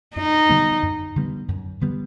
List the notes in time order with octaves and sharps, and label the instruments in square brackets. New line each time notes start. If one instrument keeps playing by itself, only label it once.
[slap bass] F#2 [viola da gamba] D#4
[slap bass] D3 G3 B3
F#2
D3 G3 B3
F#2
D3 G3 B3